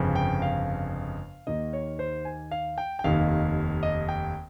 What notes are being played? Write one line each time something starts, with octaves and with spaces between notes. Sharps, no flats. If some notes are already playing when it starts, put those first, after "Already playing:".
Already playing: G1 F2 C#3
G5
F5
D#2 D#3 A#3 D#5
C#5
C5
G#5
F5
G5
G5
F1 D#2 D#3 F5
D#5
G5